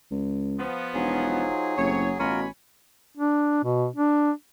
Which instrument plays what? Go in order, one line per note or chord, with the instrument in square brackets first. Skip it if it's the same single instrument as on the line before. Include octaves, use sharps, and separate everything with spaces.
[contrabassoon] C#2
[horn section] F3 B3
[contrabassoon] E1 [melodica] F#3 G#4 [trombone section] D#4 F4 C5
[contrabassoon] F#1 [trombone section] A2 C3 [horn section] C#5
[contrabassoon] A1 [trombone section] B2 [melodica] F4 A#4 [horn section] C#5 G#5 B5
[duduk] D4
B2
D4